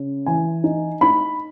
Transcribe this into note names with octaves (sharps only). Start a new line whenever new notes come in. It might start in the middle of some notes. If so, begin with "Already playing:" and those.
Already playing: C#3
E3 G#5
D#4
D#4 B5